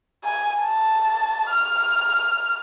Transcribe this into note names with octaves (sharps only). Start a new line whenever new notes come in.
G#5
A5
F6